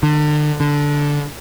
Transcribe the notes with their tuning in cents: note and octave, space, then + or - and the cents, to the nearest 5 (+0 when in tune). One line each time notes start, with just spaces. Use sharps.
D3 +35
D3 -10